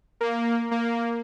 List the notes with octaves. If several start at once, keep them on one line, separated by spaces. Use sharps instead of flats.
A#3
A#3